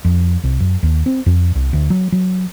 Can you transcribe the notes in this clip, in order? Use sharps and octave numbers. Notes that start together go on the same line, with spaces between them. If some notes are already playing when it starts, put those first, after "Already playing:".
F2
C2
F#2
D#2
C4
F2
C2
D2
F#3
F#3